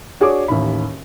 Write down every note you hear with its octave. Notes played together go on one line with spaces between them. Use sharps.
D4 F#4 G#4 C#5 D5 D6
A1 D#2 B5